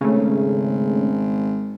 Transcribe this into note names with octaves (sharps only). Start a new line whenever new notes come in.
G#1 C#3 A3